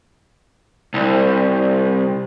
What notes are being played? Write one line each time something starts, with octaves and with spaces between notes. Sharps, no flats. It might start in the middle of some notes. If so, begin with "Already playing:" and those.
C2